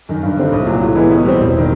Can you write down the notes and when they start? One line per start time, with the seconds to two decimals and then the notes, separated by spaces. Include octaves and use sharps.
0.09 F#2 D#3
0.23 G2
0.37 D3 G3 C4 D#4
0.52 C2
0.67 A#2 F#3
0.82 A2
0.95 E3 G#3 B3 E4
1.11 B2
1.25 G3 C4
1.40 E1
1.58 D#3